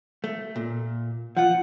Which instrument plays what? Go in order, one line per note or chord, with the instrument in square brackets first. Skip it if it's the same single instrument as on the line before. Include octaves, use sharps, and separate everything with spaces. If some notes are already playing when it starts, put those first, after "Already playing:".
[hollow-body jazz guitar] A3
A#2
[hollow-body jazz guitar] F3 F4 [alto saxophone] F#5